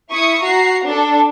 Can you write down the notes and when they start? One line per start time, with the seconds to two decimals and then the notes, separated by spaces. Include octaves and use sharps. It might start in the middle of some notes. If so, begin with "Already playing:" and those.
0.10 E4 C#6 D#6 C#7
0.43 F#4 A#5 C7
0.84 D4 A4